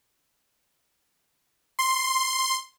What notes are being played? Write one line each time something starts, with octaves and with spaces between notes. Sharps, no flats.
C6